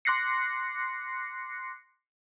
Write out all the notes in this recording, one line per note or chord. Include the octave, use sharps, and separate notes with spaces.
C6 D6 F#6 A#6 C7 C#7